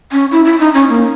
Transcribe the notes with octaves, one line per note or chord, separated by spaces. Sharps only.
C#4
E4
E4
D#4
C#4
A#3